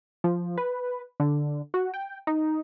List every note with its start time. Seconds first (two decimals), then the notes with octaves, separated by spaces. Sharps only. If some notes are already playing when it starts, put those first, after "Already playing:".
0.24 F3
0.58 B4
1.20 D3
1.74 F#4
1.94 G5
2.27 D#4